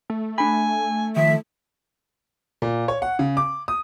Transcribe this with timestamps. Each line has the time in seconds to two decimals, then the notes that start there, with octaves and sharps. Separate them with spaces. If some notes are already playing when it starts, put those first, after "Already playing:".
0.10 A3
0.38 D4 G#5 B5
1.16 D#3 F3 E5
2.62 A#2
2.88 C#5
3.02 F#5
3.19 C#3
3.37 D6
3.68 D#6